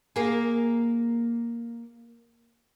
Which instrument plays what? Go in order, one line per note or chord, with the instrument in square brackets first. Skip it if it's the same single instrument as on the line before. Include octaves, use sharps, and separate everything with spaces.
[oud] A#3 G#4